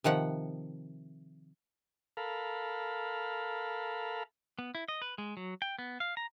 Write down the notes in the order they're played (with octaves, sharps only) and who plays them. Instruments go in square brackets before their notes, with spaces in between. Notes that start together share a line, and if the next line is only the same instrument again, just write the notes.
[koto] C3 D#3 F3 F#5
[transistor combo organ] A4 A#4 F5 B5
[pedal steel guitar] B3
E4
D#5
B4
G#3
F#3
G5
B3
F5
A#5